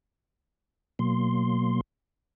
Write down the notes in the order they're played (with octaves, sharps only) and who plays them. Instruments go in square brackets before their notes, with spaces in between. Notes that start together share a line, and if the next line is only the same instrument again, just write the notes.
[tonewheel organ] B2 F#3 A#3 C6